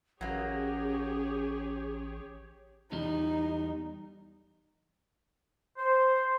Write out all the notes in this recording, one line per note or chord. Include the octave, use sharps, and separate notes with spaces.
A1 F#3 A#3 C#4 G4 G#4 C#5
E2 G3 D#4
C5